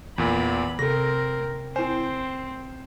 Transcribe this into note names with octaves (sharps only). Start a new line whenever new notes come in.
E2 A#2 B5
C3 C4 A4 A#4 A#6
C4 E4 C5 G#5